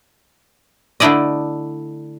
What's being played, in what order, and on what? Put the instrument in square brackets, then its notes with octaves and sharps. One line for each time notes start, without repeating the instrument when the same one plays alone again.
[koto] D3 A3 D4 E4 D5 D#5